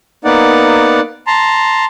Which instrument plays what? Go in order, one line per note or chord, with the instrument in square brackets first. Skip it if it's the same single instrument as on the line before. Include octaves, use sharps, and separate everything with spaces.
[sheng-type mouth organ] A#3 B3 D#4 D5 F#5
A5 A#5 C6